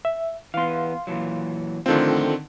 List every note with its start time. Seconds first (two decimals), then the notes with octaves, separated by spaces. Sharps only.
0.05 E5
0.54 E3 B3 F5 C6
1.07 A#2 E3 F#3
1.86 A2 D3 D#3 F3 C4 F4 A4